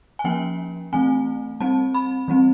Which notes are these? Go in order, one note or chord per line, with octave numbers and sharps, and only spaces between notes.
G#5
F3 A#3 C#4 G5
E3 A3 C4 G#5
G3 C4 A5
B5
E3 G3 C4